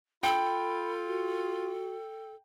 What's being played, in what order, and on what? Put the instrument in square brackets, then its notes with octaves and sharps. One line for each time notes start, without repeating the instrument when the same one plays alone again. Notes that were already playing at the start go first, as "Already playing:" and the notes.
[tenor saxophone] F4 [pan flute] A4 [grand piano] G5 [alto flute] B5
[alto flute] F#4